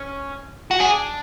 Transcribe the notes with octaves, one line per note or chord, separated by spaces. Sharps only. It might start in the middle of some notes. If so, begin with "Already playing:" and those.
Already playing: C#4
F#4
D4 G#4